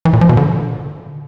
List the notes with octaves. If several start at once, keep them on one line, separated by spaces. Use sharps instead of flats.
E3
A#2
F3
B2
D3